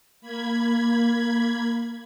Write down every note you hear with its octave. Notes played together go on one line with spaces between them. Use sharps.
A#3 B5 G#6